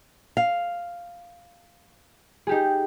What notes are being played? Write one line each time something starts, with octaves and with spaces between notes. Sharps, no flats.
F5
D#4 G4 G#4